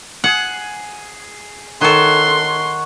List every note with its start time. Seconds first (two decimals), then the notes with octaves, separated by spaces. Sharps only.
0.24 G#4 F#5
1.81 D#3 A4 C#5 F#5 C6